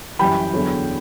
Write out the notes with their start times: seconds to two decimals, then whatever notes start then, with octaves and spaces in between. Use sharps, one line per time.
0.19 F#2 E3 G3 G5 B5
0.54 E2 D3 F#3